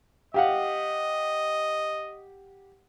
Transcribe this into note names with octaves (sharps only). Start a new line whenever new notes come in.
G4 D#5 F5 F#5